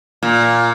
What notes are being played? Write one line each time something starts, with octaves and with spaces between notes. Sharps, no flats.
A#2